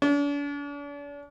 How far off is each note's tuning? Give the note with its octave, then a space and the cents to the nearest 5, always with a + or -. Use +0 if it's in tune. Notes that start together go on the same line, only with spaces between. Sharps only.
D4 -40